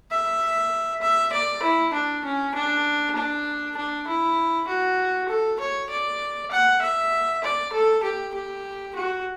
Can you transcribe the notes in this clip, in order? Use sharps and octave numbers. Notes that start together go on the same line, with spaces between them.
E5
E5
D5
E4
D4
C#4
D4
D4
D4
E4
F#4
A4
C#5
D5
F#5
E5
D5
A4
G4
G4
F#4